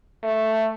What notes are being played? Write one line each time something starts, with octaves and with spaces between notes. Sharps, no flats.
A3